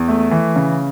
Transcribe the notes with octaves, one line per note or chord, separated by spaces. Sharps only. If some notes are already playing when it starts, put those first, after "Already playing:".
Already playing: E2
A3
E3
C#3